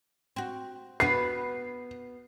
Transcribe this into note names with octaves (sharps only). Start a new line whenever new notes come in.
C4 F#4
B3 F#4 B4 C7